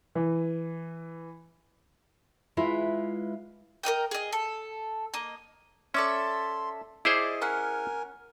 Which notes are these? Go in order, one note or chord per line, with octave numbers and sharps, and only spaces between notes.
E3
G#3 E4 F4 B4 E5
A#4 B4 D#5 G5
G#4 D#5
A4
A#3 D#5
C#4 A4 D5 E5 C6
E4 G#4 C5 D5 D#5
C#4 A#4 F#5 G#5